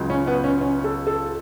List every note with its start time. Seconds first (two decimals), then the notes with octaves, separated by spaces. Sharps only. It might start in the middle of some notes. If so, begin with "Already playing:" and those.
Already playing: C#2 C#3 F#3
0.10 C#4
0.27 B3
0.44 C#4
0.61 C#4
0.84 A4
1.07 A4